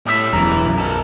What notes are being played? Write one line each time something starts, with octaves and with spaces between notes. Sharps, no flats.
A2 G3 E5
E1 F#2 E3 A#5
B1 F#2
A#4 A5